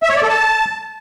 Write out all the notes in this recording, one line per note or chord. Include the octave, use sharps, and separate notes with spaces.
E5
C#5
D5
A4
A5